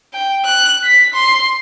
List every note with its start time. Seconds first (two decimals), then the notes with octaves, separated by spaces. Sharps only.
0.13 G5
0.46 F#6
0.84 B6
1.14 C6